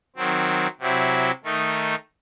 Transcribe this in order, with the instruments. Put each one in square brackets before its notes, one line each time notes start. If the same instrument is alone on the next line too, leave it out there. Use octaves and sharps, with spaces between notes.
[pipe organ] D#3 F#3 C4
C3 F#3 C4 E4
D#3 A3 D#4